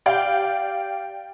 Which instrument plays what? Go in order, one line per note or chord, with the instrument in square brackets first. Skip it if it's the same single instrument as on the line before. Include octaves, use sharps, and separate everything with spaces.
[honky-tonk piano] G4 D5 F5 G5